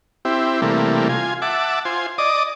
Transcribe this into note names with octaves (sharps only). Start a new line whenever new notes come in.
C4 E4 G4
C3 E3 G3 A3 A#3
F4 G#5
E5 F#5 A5 D6
F4 C5 G#5
D5 D#5 D6 D#6